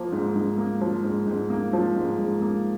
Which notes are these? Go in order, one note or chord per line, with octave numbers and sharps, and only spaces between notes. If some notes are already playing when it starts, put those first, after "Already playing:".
Already playing: F3 A#3
G#2
G#2
A#3
F3
G#2
G#2
A#3
F3
G#2
G#2
A#3